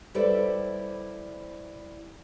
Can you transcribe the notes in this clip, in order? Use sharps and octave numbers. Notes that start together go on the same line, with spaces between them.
G3 E4 A4 B4 C5 D5